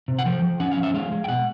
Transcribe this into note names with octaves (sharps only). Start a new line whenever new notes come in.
C3
F#5
F3 G5
F3
C#4 F#5
F5
F3
E5
G#3 F5
G#3
G5
B2 F#5